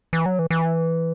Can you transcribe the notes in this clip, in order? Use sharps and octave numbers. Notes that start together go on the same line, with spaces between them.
E3
F#3
E3
E3